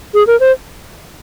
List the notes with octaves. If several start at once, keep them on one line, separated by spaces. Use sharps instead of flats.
G#4
A#4
C5